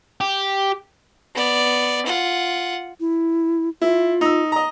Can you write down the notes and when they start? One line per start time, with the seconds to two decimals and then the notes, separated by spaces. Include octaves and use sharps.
0.21 G4
1.35 B3 D5
2.06 F4 F#5
3.00 E4
3.82 E4 F4
4.21 D#4 E6
4.52 D#5 A#5